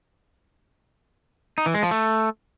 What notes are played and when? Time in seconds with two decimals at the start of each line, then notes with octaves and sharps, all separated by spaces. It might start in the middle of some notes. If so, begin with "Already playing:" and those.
1.58 D#4
1.66 E3
1.74 G#3
1.83 F3
1.91 A3